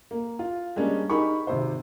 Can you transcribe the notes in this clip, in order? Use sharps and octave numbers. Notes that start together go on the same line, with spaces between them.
A#3
F4
G3 G#3 A#3 C#4 D4
D#4 G4 G#4 A#4 B5 C#6
G#1 C3 C5